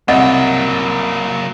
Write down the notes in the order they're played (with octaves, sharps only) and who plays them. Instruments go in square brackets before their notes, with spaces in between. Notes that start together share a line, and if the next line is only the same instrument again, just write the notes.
[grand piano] C2 [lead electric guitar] F#3 A#3 [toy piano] D#5 F#5